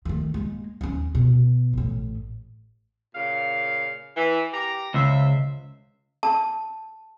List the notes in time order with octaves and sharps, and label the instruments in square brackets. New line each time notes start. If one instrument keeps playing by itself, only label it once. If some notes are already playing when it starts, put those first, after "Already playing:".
[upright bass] D#3 A3
G#3 A#3
D#2 C#4
B2
A1 A2
[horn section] A#2 C#3 F5
E3
G4 A#5
[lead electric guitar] C#2 [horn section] C5 E5
[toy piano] A5